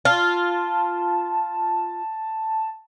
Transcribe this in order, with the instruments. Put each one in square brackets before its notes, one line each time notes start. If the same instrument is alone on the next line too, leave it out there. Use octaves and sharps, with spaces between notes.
[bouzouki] F4 [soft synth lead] A5